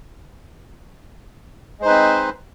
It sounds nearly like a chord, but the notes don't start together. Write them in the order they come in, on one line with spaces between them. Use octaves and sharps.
G#3 C5 D#4 B4 C4